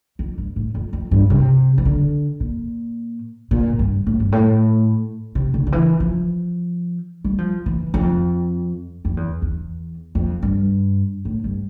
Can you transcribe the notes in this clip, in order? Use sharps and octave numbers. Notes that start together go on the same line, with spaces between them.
F2
G2
A2
F2
F2
G2
C3
E3
D3
A#2
A#2
G2
A2
G2
A2
C3
D3
D3
E3
F3
G3
F3
E3
F2
F2
E2
E2
F2
G2
A2
G2